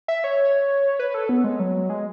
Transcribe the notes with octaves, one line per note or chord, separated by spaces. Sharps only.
E5
C#5
B4
A4
B3
G#3
F#3
G#3